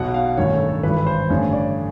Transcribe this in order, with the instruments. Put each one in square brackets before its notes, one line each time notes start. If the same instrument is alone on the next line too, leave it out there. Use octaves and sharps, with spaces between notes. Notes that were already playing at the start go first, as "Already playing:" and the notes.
Already playing: [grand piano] B1 B2 F#5
F5
A1 G2 D#3 C#5
A4
A4
G#1 G2 E3 B4
B4
C5
A1 G2 D3 C#5
D5